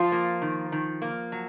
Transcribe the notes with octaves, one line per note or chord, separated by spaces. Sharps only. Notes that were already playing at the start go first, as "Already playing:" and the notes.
Already playing: F3 F4
A#3
D#3
D#3
A#3
F#3